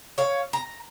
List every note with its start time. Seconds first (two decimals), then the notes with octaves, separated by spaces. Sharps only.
0.18 C#5 F5
0.53 A#5